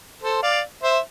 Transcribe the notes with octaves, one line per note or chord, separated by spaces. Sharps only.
A4 C5
D5 F5
C5 E5